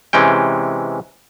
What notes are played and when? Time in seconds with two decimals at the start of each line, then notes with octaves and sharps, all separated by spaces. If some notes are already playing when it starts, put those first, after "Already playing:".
0.13 C3 E3 G#3 C#4 G5